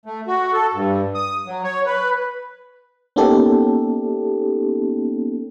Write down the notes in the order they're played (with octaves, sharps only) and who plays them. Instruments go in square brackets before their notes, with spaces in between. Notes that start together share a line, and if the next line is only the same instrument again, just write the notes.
[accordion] A3
F#4
A4
G2
D#6
F#3
C#5
B4
[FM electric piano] A#3 B3 C#4 D#4 G4 A4